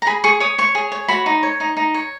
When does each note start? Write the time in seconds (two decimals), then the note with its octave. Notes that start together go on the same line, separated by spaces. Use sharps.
0.02 A#5
0.07 G#4 B5
0.24 G#4 C#6
0.40 C#5 D#6
0.58 C#5 C#6
0.75 G#4
0.92 C#5
1.08 F#4 B5
1.26 D#4
1.43 C#5
1.60 D#4
1.77 D#4
1.94 C#5